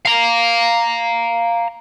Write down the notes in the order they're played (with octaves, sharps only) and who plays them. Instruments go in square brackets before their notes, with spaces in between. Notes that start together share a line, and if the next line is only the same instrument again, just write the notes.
[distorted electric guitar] F5 A#5